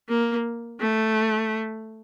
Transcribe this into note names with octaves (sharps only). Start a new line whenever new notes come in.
A#3
A3